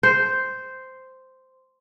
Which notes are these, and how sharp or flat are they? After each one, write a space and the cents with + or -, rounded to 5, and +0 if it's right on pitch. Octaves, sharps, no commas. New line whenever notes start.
C5 -5